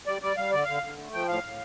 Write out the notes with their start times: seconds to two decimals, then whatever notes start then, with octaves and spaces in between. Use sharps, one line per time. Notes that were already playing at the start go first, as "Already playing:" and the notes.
0.06 G3 D5
0.22 G3 D5
0.37 G3 F5
0.51 D3 D5
0.64 D3 F5
0.83 D3
0.98 A3
1.13 F3 G5
1.28 A2 F5
1.44 A2